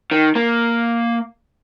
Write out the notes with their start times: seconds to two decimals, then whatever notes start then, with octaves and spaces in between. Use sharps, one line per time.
0.11 D#3
0.35 A#3